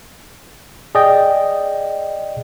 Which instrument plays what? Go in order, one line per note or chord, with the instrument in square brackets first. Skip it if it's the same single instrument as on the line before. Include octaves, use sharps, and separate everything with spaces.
[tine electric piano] G#4 D5 D#5 G5